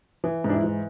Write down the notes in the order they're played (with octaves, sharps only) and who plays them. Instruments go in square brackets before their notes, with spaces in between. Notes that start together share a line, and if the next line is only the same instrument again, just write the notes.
[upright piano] E3
G#2 D4
E4
E3